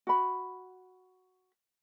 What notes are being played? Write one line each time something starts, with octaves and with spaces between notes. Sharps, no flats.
F#4 B5